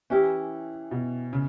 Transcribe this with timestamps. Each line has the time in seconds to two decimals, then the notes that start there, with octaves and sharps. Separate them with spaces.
0.10 E3 C#4 E4 G4
0.91 B2
1.33 C#3